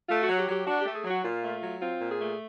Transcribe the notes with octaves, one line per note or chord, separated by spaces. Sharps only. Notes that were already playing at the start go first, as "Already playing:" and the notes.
A3 F4
F#4
F#3
G4
F#3 G4
D4 F#4
G4
A3
G#4
F#3
F#4
A#2 F4
A3
F#3
C4 F4
A#2
G#4
A3